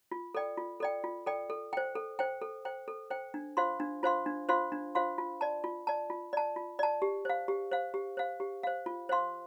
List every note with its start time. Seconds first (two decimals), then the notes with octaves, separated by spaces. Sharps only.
0.11 F4
0.35 A4 D5 G5
0.57 F4
0.80 A4 D5 G5
1.04 F4
1.27 A4 D5 G5
1.50 A4
1.73 C5 G5
1.95 A4
2.19 C5 G5
2.42 A4
2.65 C5 G5
2.88 A4
3.11 C5 G5
3.34 D4
3.57 F4 C5 F5 C6
3.80 D4
4.03 F4 C5 F5 C6
4.26 D4
4.49 F4 C5 F5 C6
4.72 D4
4.95 F4 C5 F5 C6
5.18 F4
5.41 D5 A5
5.64 F4
5.87 D5 A5
6.10 F4
6.33 D5 A5
6.56 F4
6.79 D5 A5
7.02 G4
7.25 C5 F5
7.48 G4
7.71 C5 F5
7.94 G4
8.17 C5 F5
8.40 G4
8.63 C5 F5
8.86 F4
9.09 C5 F5 C6